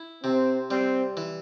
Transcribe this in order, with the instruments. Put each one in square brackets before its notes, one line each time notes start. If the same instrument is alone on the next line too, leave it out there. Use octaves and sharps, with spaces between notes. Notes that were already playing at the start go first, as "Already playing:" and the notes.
Already playing: [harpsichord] E4
[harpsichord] C3 [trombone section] C4
[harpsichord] G3 [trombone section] C4
[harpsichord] E3